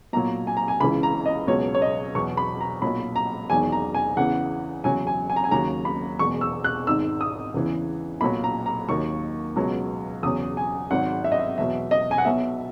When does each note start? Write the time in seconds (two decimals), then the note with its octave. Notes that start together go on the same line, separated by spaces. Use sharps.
0.13 B1 A#2 F#3 A#5
0.47 G#5
0.57 A#5
0.68 G#5
0.80 C#2 C#3 E3 B5
1.03 A#5
1.26 D#5
1.47 C#2 B2 F#3 C#5
1.75 C#5
1.82 D#5
2.15 E2 B2 F#3 C#6
2.37 B5
2.61 A#5
2.82 B1 A#2 F#3 B5
3.16 A#5
3.49 E1 E2 D#3 F#3 G#5
3.72 A#5
3.94 G#5
4.17 E2 C#3 E3 F#5
4.84 F#1 E2 C#3 F#3 G#5
5.07 G#5
5.30 G#5
5.36 A#5
5.44 G#5
5.51 D#2 C#3 F#3 A#5
5.85 B5
6.19 E1 E2 B2 C#6
6.41 E6
6.64 F#6
6.87 G#1 G#2 D#3 E6
7.21 D#6
7.54 E2 C#3 E3
8.21 B1 A#2 F#3 B5
8.44 A#5
8.66 A#5
8.89 D#2 D#3 F#3 C#6
9.56 C#2 B2 F#3
10.23 E2 C#3 F#3 D#6
10.57 G#5
10.91 G#1 G#2 F#3 F#5
11.24 E5
11.32 D#5
11.39 E5
11.58 E2 B2 F#3 E5
11.91 D#5
12.11 G#5
12.18 F#5
12.25 B1 B2 F#3 E5